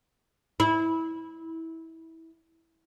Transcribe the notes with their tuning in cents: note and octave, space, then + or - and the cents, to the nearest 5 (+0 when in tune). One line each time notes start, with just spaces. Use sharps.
E4 -20